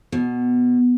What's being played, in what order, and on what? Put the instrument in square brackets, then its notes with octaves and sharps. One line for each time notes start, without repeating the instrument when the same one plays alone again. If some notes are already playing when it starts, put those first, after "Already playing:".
[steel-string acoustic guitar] B2